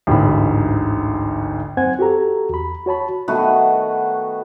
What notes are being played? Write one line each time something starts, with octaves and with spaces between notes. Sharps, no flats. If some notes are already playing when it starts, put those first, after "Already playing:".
A1 D2 G#2 B5
F#2 C4 C5 F#5 G#5 G#6
F#4 G4 A4 A#5
E2 B5
F#4 C#5 A5 B5
D#3 A3 B3 F#4